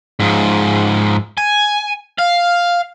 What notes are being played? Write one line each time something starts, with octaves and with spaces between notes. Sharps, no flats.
G#2 F3
G#5
F5